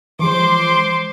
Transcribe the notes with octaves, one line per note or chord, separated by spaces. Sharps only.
E3 F3 G#3 C5 C6 D6